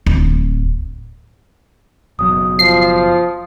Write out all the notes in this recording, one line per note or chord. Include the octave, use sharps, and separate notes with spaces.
D1
F#1 B2 F#3 D#6
F3 C7